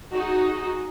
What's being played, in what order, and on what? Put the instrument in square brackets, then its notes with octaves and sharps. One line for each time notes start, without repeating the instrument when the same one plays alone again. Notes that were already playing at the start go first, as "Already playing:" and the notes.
[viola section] D#4 F#4 G#4